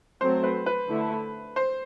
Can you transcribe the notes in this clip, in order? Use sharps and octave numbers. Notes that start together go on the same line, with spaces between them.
F#3 A3 C4 C5
B4
B4
D3 A3 E4
C5